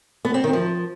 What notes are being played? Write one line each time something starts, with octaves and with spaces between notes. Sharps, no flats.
B3
C4
D#3
F3